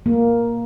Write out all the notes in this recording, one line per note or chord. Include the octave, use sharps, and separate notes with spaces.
A#3